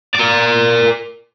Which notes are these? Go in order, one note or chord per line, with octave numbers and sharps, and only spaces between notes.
A#4 D5